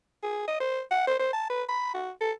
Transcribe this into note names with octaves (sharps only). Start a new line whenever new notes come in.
G#4
D#5
C5
F#5
C5
C5
A5
B4
B5
F#4
A4